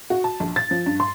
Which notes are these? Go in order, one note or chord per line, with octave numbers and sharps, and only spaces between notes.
F#4
A5
A#1
A6
F3
G2
C6